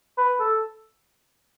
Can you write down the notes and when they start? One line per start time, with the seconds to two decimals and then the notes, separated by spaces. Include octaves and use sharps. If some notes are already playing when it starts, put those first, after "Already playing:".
0.18 B4
0.40 A4